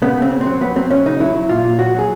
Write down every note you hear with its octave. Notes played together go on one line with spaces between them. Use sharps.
C#3 B3
C#3 C4
C#3
C4
F#3
F#3 B3
F#3 C4
F#3 C#4
C#3 D#4
F#3 E4
F#3
A#2 F4
A#2
F#3 F#4
F#3 G#4